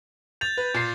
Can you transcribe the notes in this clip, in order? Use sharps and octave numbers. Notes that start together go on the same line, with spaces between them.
G6 A6 F7
B4
A#2 C7